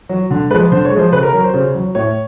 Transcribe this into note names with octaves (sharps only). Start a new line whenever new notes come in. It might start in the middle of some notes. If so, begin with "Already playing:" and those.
F#3
D3
F3 G#3 B4
D3 C5
C#5
G#3
F3 C5
C#3 B4
A#4
F#3 A#4
C5
C#3
F#3
A2 C#5